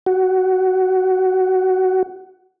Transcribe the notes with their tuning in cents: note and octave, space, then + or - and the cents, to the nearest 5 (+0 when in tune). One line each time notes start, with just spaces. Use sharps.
F#4 +15